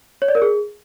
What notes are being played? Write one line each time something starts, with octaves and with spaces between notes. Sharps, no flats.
C#5
D5
A#4
G#4